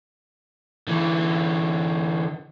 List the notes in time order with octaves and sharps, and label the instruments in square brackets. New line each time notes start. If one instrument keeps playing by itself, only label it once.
[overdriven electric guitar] D3 E3